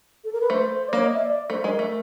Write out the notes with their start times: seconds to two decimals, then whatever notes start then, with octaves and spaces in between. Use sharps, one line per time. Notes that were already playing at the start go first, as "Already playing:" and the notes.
0.24 A4
0.33 A#4
0.41 B4
0.50 A3 C5
0.89 D5
0.93 A#3 C#5
1.03 D#5
1.14 E5
1.25 D5
1.50 A3 C5
1.64 G#3 A#4
1.79 A3